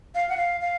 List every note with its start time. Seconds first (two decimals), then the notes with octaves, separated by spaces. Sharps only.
0.15 F5
0.29 F#5
0.37 F5
0.61 F5